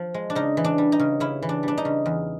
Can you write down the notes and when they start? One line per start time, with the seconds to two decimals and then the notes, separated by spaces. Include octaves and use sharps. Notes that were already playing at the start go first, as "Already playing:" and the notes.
Already playing: F3
0.14 G#3
0.30 D4
0.35 C#3 D#4
0.57 E3
0.64 D4
0.78 G3
0.92 D#4
1.00 C#3
1.20 C#3 E4
1.42 E3
1.49 D4
1.63 G3 D4
1.77 D#4
1.85 C#3
2.06 E2